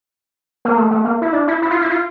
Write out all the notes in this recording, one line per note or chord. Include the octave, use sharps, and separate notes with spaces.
A#3
A3
A3
A#3
E4
D4
E4
E4
F4
E4
F4